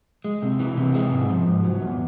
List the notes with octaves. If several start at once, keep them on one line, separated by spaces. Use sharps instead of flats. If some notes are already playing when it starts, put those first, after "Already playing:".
G#3
C3
E3
C3
G#3
G#2
F3
G#2
F#3
E2